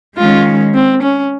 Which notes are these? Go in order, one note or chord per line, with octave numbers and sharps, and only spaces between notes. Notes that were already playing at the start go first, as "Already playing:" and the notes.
D#3 G#3 C#4 F4
C4
C#4